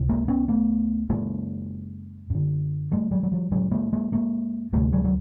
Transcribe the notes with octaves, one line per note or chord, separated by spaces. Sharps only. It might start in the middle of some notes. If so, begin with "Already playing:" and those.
Already playing: C#2 C3
G#3 A#3
B3 C#4
A3 B3
F#2 C#3 G#3 A#3
F#2 D3
G3 A3
F#3 G#3
F#3
F3 G3
F#2 C#3 F#3 G#3
G#3 A#3
G#3 A#3
G#3 A#3
D2 C3 G3 A3
F#3 G#3
F#3